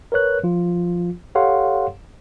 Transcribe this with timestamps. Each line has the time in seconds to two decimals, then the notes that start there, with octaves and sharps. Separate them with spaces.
0.12 A#4 B4 C#5 F#6
0.44 F3 F4
1.35 G4 A4 C#5 F5 F#5 C6